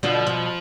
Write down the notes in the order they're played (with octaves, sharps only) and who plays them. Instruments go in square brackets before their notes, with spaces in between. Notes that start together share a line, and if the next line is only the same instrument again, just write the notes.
[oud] B2 D3 [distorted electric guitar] F3
[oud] B2